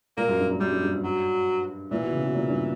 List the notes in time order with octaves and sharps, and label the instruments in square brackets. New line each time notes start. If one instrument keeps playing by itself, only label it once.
[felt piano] A#2 [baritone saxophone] A#3
[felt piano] F#2
G2
G2
[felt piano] F#2 [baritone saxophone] G3
[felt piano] G2
G2
G2
[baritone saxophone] F#3
[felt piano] A#2 [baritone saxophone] E3
[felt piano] B2
C#3
B2
A#2
G2